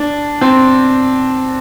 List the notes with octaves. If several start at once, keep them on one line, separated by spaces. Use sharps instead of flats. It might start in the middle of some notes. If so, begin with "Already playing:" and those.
Already playing: D4
C4